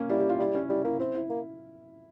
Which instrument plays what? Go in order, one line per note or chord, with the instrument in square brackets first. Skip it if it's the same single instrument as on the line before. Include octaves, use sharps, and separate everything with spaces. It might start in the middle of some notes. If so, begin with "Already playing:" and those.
Already playing: [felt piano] A#3 C#4
[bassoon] G3 [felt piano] E4
[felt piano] G4
F4
[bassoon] G3 [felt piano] E4
[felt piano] C#4
[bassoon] G3 [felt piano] E4
[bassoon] A#3 [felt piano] E4
[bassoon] C4 [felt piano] E4
[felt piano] E4
[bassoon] A#3